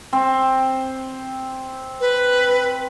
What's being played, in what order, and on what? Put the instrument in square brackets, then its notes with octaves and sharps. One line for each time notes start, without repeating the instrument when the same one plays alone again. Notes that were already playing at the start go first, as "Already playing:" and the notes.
[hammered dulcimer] C4
[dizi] B4